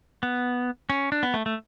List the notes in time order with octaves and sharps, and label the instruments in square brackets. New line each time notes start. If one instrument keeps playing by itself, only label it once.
[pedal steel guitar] B3
C#4
D4
B3
A3
A3